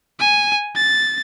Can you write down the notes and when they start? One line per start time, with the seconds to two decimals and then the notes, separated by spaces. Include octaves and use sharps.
0.19 G#5
0.75 A6